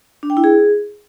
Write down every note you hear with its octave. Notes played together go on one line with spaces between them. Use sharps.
D4
G5
E4
G#4